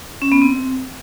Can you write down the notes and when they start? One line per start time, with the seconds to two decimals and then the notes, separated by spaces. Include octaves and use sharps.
0.22 C#4
0.32 B3
0.42 C4